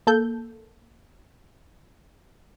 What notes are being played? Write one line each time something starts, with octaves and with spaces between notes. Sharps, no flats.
A#3 A4 G6